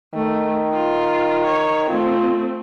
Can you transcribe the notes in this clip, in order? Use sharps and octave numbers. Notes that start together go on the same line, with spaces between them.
D#3 A3
F4
C#5
A3 C4 F4